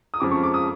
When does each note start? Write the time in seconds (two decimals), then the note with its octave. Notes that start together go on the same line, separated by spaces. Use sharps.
0.14 D#6
0.20 F2 C#3 F3 G#3 D6
0.31 C#6
0.43 D6
0.54 D#6